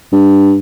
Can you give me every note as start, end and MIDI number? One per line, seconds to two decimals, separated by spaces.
0.13 0.58 43